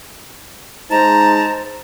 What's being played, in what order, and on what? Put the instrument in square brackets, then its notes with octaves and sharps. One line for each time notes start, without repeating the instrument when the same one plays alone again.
[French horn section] G#3 D#4 [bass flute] C5 [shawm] A5 [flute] A#5